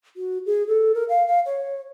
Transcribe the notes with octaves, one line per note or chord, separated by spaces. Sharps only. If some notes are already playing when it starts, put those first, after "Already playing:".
F#4
G#4
A4
A#4
F5
F5
C#5